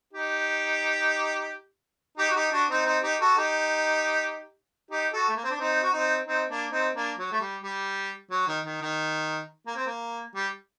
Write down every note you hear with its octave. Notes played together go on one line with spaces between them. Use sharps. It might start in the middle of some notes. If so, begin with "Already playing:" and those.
D#4 G4
D#4 G4
F#4
D#4 G4
D4 F#4
C4 D#4
C4 D#4
D#4 G4
F#4 A4
D#4 G4
D#4 G4
F#4 A4
A3
A#3
C4
D4
C4 D#4
F#4
C4 D#4
C4 D#4
A#3 D4
C4 D#4
A#3 D4
F#3
A3
G3
G3
F#3
D#3
D#3
D#3
A#3
C4
A#3
G3